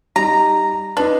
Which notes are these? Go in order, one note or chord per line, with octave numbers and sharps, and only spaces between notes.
G3 D#4 A#5
D4 D#4 B4